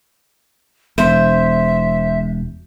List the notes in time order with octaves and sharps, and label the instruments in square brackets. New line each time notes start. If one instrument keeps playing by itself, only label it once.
[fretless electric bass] E1 [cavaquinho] C5 [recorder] E5